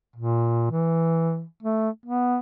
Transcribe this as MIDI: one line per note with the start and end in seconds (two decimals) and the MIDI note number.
0.16 0.70 46
0.71 1.44 52
1.63 1.90 57
2.06 2.39 59